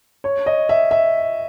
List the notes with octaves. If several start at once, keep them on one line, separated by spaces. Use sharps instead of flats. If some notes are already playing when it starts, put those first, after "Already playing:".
C#5
D#5
E5
E5